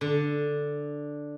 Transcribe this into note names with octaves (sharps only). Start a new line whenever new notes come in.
D3